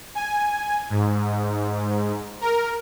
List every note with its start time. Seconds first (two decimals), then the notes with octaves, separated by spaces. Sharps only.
0.15 G#5
0.90 G#2
2.41 A#4